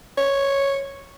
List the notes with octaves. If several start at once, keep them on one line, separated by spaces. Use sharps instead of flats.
C#5